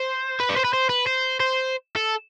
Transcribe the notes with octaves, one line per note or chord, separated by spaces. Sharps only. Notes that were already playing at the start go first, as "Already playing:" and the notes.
Already playing: C5
B4
D5
C5
B4
C5
B4
C5
C5
A4